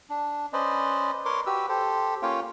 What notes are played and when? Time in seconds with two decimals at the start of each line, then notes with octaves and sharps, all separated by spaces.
0.10 D4
0.53 C#4 B4 C5 D5 D#5
1.25 A#4 B4 C#5 C6 D6
1.46 F#4 G4 B4 E6
1.69 G4 A4 C5
2.22 A#3 C#4 F4 C#5 F5 G5